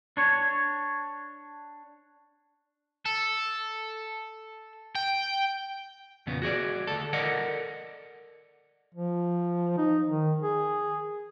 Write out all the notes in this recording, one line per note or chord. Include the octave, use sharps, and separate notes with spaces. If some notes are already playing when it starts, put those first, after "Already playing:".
D4 C#5
A4
G5
E2 A#2 C#3 B3
F#4 G#4 C#5 D5
D2 G2 A4
A4 A#4 D5 D#5 F#5
F3
D#4
D#3
G#4